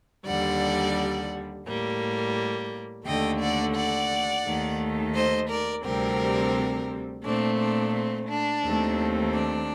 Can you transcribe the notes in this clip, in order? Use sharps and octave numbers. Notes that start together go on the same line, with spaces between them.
D#2 D3 G3 D5 F#5
A2 G3 A#3
D#2 D3 A3 D#5 G5
D5 F#5
D5 F#5
D#2 D#3 A3
C5 D#5
A#4 D5
D2 C3 G3 C4 G4 A#4
A#2 A3 C4 D4
D4
C4
D4
D#2 D#3 A3 C4
D4